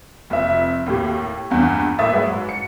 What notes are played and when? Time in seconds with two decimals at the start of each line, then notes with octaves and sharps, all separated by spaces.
0.30 F1 F2 E5
0.86 D#2 A2 G4
1.51 A#1 E2 G2
1.99 A2 A#3 E5 D#6 A6
2.13 G#2 F#3 G#3 B4
2.49 C#7